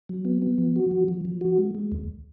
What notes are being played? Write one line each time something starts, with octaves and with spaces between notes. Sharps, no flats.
F#3
B3
B3
F3
F#4
F3
F3
F3
F#4
G#3
G#3
D#2